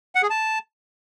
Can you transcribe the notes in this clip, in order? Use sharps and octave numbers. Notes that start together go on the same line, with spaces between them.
F#5
G#4
A5